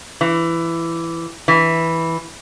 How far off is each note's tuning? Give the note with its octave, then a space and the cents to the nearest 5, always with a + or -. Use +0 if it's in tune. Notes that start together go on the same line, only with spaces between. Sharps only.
E3 +15
E3 -5